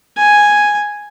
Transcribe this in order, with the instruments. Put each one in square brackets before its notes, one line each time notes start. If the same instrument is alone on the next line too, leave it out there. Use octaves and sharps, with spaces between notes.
[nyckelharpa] G#5